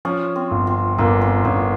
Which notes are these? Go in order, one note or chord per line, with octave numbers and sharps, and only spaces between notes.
F3 C#4
C4
G1
C4
G1 A#3
C4
G1 C#4